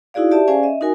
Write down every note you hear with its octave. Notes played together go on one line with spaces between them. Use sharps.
D#4 E4 F#4 G#4 D5 F5
G4 D5 E5 A5
C#4 G#4 C5 D5 F5 G#5
D#5 E5
D#4 F#4 A#4 G#5